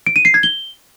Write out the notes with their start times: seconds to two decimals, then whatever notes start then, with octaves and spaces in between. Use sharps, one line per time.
0.07 D7
0.16 D#7
0.25 C7
0.34 G#6
0.43 G7